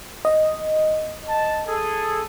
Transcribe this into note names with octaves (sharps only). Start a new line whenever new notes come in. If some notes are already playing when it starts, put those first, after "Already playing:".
D#5
A5
G#4 A4